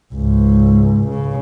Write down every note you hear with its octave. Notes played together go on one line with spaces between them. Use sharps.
C#2 G#2
C#3